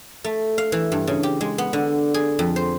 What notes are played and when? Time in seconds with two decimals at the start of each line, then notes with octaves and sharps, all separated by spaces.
0.24 A3
0.58 F5
0.72 E3
0.92 G2
1.07 C#3
1.23 G4
1.41 G#3
1.58 B3
1.73 D3
2.14 G#4
2.39 F2
2.56 C5